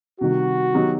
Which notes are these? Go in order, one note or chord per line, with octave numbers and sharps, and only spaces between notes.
C3 D#3 G3 F#4
D#3 F#3 B3 D#4 G4